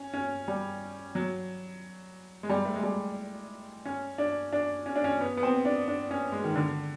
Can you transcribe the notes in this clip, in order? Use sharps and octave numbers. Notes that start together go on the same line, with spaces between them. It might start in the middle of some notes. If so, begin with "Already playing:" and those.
Already playing: C#4
C#4
G3
F#3
G#3
G3
A3
G#3
G3
C#4
D4
D4
C#4
D4
C#4
B3
B3
C4
D4
D4
C#4
G#3
D#3
D3